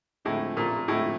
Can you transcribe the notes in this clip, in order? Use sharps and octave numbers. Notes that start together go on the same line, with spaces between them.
A2 D3 F3 G#3 C4 D#4
A#2
A2 D3 F3 G#3 C4 D#4